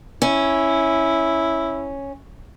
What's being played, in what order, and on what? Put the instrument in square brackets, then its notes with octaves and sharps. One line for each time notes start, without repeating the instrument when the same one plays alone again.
[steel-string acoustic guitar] C#4 [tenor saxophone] E4